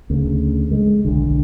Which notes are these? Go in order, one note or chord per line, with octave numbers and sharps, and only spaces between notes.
D2 C#3
G#3
B1 D3